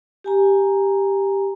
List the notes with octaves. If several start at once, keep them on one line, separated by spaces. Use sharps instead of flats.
G4 G#5 A#5